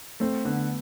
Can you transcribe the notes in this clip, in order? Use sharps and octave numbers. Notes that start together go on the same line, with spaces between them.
A3 C4
D3 B3